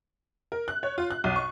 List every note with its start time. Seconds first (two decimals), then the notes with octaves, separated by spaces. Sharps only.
0.52 A#4
0.68 F#6
0.83 C#5
0.98 F4
1.11 F#6
1.24 B1
1.36 C#6